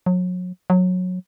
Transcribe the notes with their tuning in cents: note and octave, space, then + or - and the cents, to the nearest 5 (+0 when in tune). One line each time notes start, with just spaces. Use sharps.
F#3 -35
F#3 -20